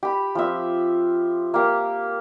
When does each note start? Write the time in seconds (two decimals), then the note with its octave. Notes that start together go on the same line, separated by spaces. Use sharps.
0.03 G4 B5
0.35 F3 C4 E5
1.54 A#3 G4